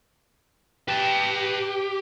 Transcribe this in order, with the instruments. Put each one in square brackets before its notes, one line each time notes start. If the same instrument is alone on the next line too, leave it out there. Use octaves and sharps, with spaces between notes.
[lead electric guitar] G4 [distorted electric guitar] B4 A5